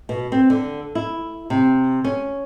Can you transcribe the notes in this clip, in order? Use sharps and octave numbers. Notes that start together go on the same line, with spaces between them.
B2
C4
D3
E4
C3
C#4